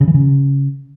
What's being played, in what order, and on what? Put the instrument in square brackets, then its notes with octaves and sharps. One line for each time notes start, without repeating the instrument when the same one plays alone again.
[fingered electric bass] C#3
E3
C#3